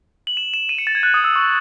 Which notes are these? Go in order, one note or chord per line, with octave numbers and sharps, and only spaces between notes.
F#7
E7
E7
D#7
C#7
A6
G#6
F#6
D#6
E6
C#6